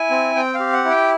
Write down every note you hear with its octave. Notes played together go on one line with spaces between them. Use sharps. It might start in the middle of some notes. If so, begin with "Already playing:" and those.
Already playing: E4 G#5
C4
C4 G5
F5
G4
F#5
E4
G5